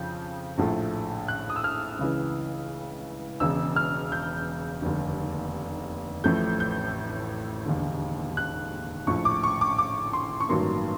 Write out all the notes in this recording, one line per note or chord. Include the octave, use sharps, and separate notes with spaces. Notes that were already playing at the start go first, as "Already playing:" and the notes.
Already playing: F2 C#3 F3 G6
A#1 A2 F3 A3
F#6
D#6
E6
F6
C#2 C#3 E3
E1 E2 C#3 E6
F6
G6
F1 D#2 D3
A1 A2 F3 A3 G6
G6
E1 D#2 D3
F#6
A#1 A2 F3 C#6
D6
C#6
D6
D6
C6
C#6
A1 G2 D#3 F#3 A#3 C6